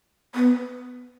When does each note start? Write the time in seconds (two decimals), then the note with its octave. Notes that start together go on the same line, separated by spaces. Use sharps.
0.35 B3